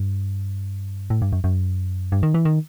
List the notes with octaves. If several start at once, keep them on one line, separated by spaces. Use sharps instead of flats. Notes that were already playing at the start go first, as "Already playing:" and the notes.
Already playing: G2
A2
G2
F#2
F#2
G2
D#3
E3
D#3